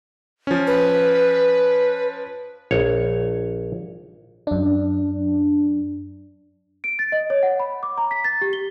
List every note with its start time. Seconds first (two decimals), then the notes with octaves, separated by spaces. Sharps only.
0.47 F3 C#4
0.67 B4
2.71 A#1 C#5
4.47 F#2 D4
6.84 D7
6.99 A6
7.12 D#5
7.30 C#5
7.43 F#5
7.60 B5
7.83 D6
7.98 A#5
8.11 B6
8.24 A6
8.41 G4
8.53 G7